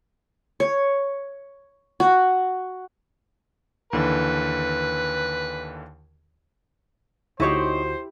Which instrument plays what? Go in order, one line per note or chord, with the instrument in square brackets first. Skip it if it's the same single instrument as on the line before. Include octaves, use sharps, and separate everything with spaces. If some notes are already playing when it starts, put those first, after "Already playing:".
[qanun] C#5
F#4
[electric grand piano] D#2 D3 E3 [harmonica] B4
[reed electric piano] D2 F#4 [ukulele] D#4 C#5 D#5 [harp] E4 G4 [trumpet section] C5